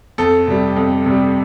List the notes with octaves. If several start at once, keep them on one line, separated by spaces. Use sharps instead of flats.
F2 A4
C3 G3
F2
C3 G3